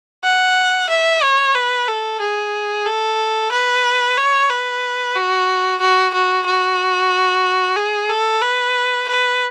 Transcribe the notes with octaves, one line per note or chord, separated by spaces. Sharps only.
F#5
E5
C#5
B4
A4
G#4
A4
B4
C#5
B4
F#4
F#4
F#4
F#4
G#4
A4
B4
B4